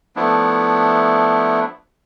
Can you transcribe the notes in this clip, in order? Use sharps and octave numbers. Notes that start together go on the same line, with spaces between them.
F3 A3 B3 D4 E4